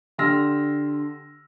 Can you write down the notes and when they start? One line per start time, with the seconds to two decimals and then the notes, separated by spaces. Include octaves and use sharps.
0.18 D3 G4 C6 E6 F6 A#6